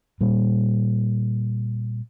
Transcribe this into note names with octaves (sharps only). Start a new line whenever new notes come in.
A#2 G3